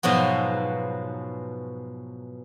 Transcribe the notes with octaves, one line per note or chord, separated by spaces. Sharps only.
G#2 B2 F3 F#3 B3